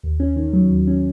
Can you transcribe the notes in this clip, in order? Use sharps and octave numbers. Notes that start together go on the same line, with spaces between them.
D#2
C#4
D#3
F#3
D#2
C#4